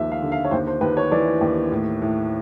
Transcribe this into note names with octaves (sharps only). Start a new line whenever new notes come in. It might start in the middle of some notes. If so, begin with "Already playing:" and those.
Already playing: D#2 F3 E5
F5
D3
F5
C#5
D#2 C5
C5
D#2 B4
C#5
E3 D5
D#2
A2
A2